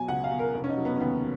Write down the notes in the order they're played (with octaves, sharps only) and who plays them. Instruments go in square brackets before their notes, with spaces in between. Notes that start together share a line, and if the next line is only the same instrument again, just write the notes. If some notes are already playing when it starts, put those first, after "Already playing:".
Already playing: [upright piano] B2 F#3 G#5
C#2 F#5
F5
B2
A#4
F1
C#4
D#4
F#3
B3
C#4
D#2 B3